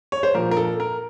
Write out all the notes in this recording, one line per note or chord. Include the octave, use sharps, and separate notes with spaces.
C#5
C5
A#2 F3 A#4
A#4
A4
A#4